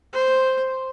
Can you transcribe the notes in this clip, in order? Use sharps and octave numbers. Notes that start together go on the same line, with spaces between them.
C5